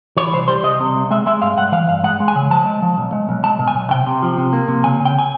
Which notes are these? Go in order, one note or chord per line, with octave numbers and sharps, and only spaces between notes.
E3 C#5
C2 C5
G3 C5
C2 D#5
C3
C2
G#3 E5
G#3 E5
G2 F5
G2 F#5
E3 F5
G2 F5
G#3 F#5
G#3
G#5
C#3
F3 A5
G#3
F3
B1
G#3
B1
G#3 A5
B2
G#5
B1
C3 G5
C3
F3
C3
A#3
C3
C#3 G#5
C#3
G5
G#5